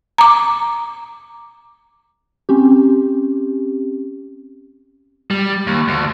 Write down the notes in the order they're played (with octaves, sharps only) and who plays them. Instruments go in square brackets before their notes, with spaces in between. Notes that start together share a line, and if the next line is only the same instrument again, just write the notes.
[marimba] A#5 D6
[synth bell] C4 C#4 G4
[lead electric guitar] G3
D#2
D2